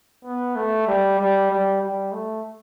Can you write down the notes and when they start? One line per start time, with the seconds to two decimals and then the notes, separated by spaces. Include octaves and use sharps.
0.25 B3
0.56 A3
0.88 G3
1.19 G3
1.50 G3
1.81 G3
2.12 A3